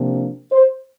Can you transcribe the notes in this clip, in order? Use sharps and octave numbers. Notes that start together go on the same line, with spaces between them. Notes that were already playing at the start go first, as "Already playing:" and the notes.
Already playing: C3 F3 A#3 D4
C5